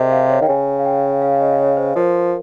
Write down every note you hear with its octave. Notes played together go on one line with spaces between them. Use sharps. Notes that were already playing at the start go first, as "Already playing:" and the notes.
Already playing: C3 G4 G#4 A#4 C5 D#5
F5
C#5
D#3 G5
C#3 G#5
F5
G5
F5
F5
D#5
C#5
C5
F3 A#4